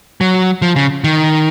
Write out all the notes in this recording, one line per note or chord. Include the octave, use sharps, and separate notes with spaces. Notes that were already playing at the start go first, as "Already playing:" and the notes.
F#3
F3
C#3
D#3